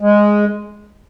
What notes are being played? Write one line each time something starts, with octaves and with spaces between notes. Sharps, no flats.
G#3